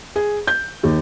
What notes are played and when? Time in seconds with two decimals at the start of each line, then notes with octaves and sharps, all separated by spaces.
0.16 G#4
0.47 G6
0.83 D#2